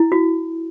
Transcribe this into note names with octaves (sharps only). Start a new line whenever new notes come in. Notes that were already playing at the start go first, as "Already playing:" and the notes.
Already playing: E4
F#4